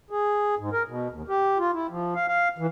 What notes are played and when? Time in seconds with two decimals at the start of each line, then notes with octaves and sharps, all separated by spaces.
0.11 G#4
0.59 G#2
0.72 A#4
0.88 B2
1.10 D#2
1.28 G4
1.58 F4
1.73 E4
1.90 F3
2.15 F5
2.28 F5
2.58 E3